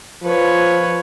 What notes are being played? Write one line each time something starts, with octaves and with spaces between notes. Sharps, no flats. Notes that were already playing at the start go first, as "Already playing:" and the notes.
F3 B4 C#5